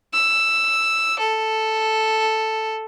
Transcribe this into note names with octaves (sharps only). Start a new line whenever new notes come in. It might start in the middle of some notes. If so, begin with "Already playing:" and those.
E6
A4